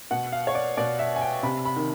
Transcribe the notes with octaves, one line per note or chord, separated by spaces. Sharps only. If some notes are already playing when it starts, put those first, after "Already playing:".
B2 F#5
F5
C#5
D5
B2 D5
E5
G#5
G5
C3 B5
B5
D#3